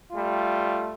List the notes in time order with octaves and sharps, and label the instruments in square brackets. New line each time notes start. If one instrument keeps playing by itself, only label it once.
[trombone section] G3 A3 F4